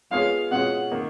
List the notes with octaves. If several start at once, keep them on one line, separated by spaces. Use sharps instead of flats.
G#3 B3 F4 G#4 C#5 F5
B2 G#3 C#4 F4 F#5
D#3 A#3